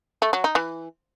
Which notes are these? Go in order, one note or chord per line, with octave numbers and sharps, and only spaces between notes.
A3
F#3
D#4
E3